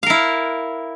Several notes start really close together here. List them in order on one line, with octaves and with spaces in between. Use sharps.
F5 A#4 E4